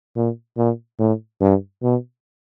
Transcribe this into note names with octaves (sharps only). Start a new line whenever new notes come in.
A#2
A#2
A2
G2
B2